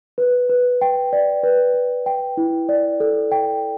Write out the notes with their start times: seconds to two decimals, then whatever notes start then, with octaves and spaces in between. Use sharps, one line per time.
0.18 B4
0.49 B4
0.82 G5
1.13 D5
1.43 B4
1.74 B4
2.06 G5
2.37 E4
2.69 D5
3.00 A4
3.32 G5